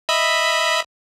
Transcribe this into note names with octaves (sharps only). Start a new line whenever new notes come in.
D#5 E5 B5